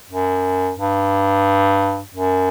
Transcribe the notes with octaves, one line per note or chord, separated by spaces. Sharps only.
F#2
G2
F#2